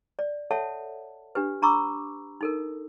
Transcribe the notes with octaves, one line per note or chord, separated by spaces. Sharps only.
D5
A4 C#5 E5 F#5 A5
D4 G4 B4
D4 A#5 B5 C#6 D6 E6
D#4 A4 A#4